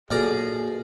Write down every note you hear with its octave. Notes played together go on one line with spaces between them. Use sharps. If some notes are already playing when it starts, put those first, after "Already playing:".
B1 A#2 G#4 A4 D5 A#5 F6